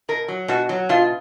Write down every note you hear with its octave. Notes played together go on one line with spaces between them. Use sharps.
B2 A#4
F#3
B2 F#4
F#3
B2 F4